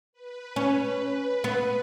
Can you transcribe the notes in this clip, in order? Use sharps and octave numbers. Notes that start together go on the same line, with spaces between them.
B4
C#4
B3